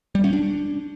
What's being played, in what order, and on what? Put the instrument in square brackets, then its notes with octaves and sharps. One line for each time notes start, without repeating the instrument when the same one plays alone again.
[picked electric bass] G3
C#4
D4